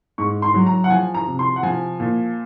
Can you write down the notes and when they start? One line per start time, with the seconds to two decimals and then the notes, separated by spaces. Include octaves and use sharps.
0.18 G#2 C#6
0.42 C6
0.54 F#3
0.66 A#5
0.84 F#5
0.90 F3 G#5
1.15 A#5
1.27 C3
1.39 C6
1.56 F#5
1.63 F3 G#5
2.00 A#2